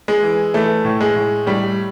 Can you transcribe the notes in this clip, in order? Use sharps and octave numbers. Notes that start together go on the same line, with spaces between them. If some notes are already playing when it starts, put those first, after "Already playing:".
G#3
E3
E3 A3
A2
G#3
A2
A2 G3